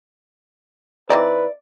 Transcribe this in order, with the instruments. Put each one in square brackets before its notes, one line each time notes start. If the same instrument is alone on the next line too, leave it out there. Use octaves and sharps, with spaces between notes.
[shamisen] E3 C4 D#4 [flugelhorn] B4 [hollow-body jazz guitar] D5